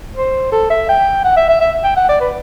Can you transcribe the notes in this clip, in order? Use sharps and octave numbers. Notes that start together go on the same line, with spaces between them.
C5
A4
E5
G5
F#5
E5
E5
E5
G5
F#5
D5
B4